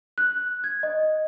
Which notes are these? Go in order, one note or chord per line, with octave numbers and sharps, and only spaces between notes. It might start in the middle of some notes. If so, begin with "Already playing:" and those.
F#6
G#6
D#5